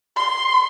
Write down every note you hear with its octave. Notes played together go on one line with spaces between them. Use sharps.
C6